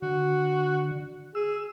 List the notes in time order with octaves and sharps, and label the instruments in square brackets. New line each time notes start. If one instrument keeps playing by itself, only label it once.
[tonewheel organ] D3 [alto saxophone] F#4
[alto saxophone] G#4 [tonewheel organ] E6